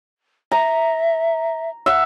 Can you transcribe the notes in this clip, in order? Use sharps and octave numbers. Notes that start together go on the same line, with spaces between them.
E5 A#5
E5 F#5